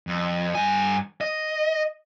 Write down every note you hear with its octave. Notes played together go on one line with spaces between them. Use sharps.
F2
G2 G#5
D#5